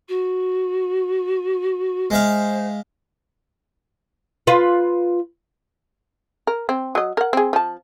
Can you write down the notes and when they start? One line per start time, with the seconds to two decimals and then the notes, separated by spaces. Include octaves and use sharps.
0.08 F#4
2.10 G#3 C5 E5 F5
4.47 F4 B4
6.47 A#4
6.69 C4
6.95 F#3 D#5
7.17 A#4 F#5
7.33 C4 G#4
7.53 F3 A5